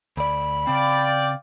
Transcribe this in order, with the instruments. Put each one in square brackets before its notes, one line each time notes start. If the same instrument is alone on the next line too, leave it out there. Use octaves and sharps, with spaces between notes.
[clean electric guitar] D2 D5 [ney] B5
[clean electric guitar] C#3 C4 [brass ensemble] D5 [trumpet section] F5 G5